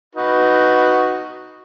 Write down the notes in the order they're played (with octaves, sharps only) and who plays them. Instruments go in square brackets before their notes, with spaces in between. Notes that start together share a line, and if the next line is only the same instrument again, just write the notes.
[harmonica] D#4 F#4 B4